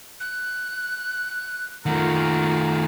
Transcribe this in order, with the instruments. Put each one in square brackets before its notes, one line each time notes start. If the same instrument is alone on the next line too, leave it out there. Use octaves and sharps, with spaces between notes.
[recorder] F#6
[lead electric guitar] D#3 A3 [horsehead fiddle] F4 A#4 [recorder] F#5